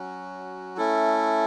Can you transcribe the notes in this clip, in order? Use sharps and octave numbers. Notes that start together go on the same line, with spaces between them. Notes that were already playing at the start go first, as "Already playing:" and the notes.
Already playing: F#3 C#4 F#4
A3 C#4 E4 A4